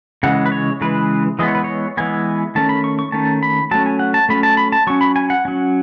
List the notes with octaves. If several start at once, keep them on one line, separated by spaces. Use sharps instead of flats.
C#3 E3 G#3 F#5
B4
C#5
C#3 E3 G#3 B4
E3 G#3 B3 D#5
C#5
B4
C#5
E3 G#3 B3 G#5
D#3 A3 C#4 A5
B5
C#6
C#6
D#3 A3 C#4 A5
B5
F#3 A3 C#4 A5
G#5
F#5
A5
F#3 A3 C#4 B5
A5
B5
A5
F#3 C#4 C#6
B5
G#5
F#5
F#3 C#4